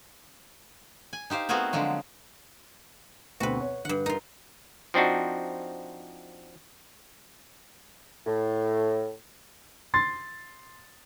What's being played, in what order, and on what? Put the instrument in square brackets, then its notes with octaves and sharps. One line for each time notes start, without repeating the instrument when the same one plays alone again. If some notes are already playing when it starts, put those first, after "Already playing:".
[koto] G#5
D#4 G4 C5 F5
A3 B3 C4 F#4 G#4 A#4
D3 F3 F#3 G#3
[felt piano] D2 B2 C4 [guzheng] F#4 B4
[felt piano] C#5
[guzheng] G2 F#5 [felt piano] D3
[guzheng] D#4 F4 [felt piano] A#4
[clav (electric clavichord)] F3 C4 D4 D#4 F#4
[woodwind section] A2
[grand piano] C6 A6